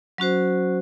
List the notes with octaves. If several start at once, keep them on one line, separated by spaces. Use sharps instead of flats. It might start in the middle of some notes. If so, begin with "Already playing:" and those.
F#3 C#4 F#4 C5